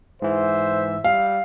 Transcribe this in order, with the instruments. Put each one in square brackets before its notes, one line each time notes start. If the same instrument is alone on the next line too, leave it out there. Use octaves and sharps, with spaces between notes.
[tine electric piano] G#2 E3 [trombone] C5 [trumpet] E5
[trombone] G3 [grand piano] F5